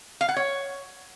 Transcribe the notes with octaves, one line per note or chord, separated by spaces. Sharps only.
F5
F#5
C#5